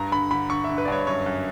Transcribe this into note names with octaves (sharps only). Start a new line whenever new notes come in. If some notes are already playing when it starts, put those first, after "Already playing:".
Already playing: G2 A#5
D3 B5
D3 B5
D3 C#6
D3 E5
B4
D5
G2 C#5
F#2 C#5
F#2